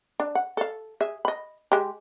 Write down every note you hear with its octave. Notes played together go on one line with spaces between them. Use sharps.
D4
F#5
A4 F5
G#4 E5
D#5 B5
G#3 G4